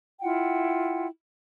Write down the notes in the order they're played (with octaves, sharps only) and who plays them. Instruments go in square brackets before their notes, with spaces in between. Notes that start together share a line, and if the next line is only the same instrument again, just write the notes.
[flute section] E4 F4 F#5 G5